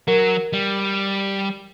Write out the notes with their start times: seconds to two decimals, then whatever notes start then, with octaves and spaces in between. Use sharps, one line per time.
0.08 F#3 A#4
0.53 G3